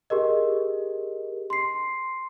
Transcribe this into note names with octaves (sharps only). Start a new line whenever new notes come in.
G4 G#4 A#4 D#5
C6 C7